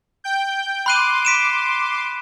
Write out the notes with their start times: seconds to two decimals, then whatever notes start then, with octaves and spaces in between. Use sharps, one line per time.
0.24 G5 G6
0.86 B5 C6 D6 F#6 D#7
1.25 B6 D7 E7